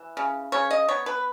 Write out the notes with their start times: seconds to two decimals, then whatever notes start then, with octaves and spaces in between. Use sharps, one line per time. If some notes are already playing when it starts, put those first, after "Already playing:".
Already playing: E3
0.17 C#3
0.52 C#3 C#5
0.71 D#5
0.89 B3 C#5
1.06 B4